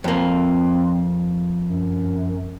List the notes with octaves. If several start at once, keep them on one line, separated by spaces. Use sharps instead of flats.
F2 A#3 C4
F#2